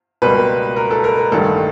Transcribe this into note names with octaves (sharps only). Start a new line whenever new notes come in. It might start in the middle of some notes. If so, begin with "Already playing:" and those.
C#2 B2 G3 A#3 B4
A#4
A4
A#4
A1 G2 D#3 G3 A#3 A4